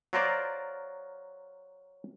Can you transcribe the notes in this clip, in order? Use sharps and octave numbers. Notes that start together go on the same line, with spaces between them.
F#3 F4 A#4 C5 D5